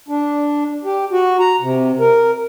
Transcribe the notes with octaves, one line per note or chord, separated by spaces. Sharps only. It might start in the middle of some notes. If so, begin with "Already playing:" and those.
D4
G4
F#4
A#5
C3
A#4